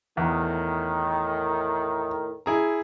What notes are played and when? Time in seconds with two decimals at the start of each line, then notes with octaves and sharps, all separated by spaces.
0.17 E2 A2 D#3
2.46 E4 G#4 A#5